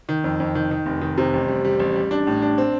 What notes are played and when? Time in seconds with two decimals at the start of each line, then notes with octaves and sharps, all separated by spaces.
0.09 D#3
0.24 F2
0.40 F2
0.55 D#3
0.71 D#3
0.86 F1
1.01 D#3
1.17 C3
1.33 A1
1.48 G3
1.65 G3
1.80 A1
1.96 G3
2.11 D4
2.27 A2
2.42 D4
2.58 C4